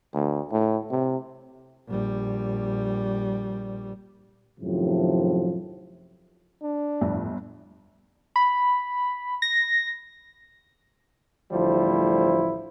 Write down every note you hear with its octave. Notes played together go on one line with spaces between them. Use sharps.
D2
A2
C3
A#1 G3
F#2 A2 C3 D#3 F3
D4
G1 F2 A2
B5
A#6
A1 D2 F3 G3 E4 C5